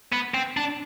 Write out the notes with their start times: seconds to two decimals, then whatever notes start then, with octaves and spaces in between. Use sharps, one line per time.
0.13 B3
0.34 C4
0.57 D4